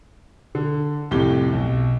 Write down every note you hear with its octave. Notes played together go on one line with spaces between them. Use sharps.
D3
C2 F2 A2 G4 G7
B1